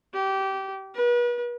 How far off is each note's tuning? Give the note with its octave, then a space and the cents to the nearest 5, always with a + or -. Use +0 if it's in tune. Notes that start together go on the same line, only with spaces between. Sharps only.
G4 -20
B4 -40